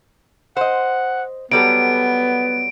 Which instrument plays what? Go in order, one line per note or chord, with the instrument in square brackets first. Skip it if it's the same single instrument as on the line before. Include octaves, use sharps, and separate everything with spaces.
[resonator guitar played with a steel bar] C5 D#5 [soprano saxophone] F#5
[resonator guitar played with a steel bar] F#3 G3 A4 [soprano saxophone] B3 [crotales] D7